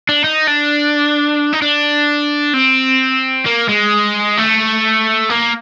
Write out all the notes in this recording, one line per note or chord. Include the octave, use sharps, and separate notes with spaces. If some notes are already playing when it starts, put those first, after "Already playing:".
D4
D#4
D4
D#4
D4
C4
A#3
G#3
A3
A#3